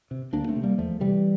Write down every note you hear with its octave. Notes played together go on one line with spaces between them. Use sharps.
C3
D2 A#3 D4
A3 C4
C3
G3 A#3
E2 F3 A3
C3 E3 G3